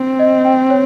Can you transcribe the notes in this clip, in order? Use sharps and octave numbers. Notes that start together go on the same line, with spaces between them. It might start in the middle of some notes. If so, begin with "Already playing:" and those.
Already playing: C4
D#5
G5
C#5